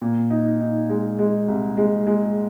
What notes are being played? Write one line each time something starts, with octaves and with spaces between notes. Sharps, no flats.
A#2
D#4
D#4
G#3
G#3
C2
G#3
G#3